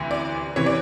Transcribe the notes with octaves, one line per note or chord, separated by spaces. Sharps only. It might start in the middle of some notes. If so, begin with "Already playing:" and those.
Already playing: D2 C3 E3
D5
C3 E3 C#5
D5